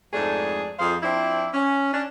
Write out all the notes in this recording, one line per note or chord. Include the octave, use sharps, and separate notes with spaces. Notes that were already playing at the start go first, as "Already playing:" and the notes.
F2 G#2 A3 D4 D#4 G#4
F2 F3 G#4 C5 D#5 F5
F3 C4 D4 E4
C#4
C#4 D4